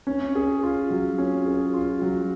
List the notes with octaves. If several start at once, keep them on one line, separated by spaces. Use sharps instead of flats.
C#4
G#4
F4
F#3
C#4
G#4
F4
F#3